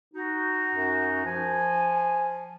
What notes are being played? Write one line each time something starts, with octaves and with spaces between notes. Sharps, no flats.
D#4 F#4
F#2
F3 G#5